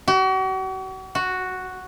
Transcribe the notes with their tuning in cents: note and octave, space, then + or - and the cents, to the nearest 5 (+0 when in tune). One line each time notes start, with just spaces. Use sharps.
F#4 +40
F#4 +0